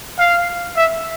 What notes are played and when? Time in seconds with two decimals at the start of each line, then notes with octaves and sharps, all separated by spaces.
0.19 F5
0.77 E5